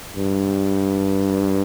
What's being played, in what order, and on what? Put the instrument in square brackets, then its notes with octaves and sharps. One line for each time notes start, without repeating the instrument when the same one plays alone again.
[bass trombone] G2